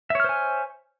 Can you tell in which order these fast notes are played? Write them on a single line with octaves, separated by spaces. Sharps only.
E5 C#5 F6 C5 G#5